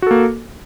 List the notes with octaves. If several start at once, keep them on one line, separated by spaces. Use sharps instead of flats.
A#3 F#4 A4